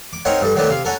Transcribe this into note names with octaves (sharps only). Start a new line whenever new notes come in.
D6
C4 C#4 D#4 A#4 C#5 F#5
G2 A4
D#3 F#3 A3 B3 D4
C3 F5
C#4 F#4 A4 A#4